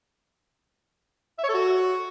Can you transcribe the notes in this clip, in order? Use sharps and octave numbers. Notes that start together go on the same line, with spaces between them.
E5
C#5
A4
F#4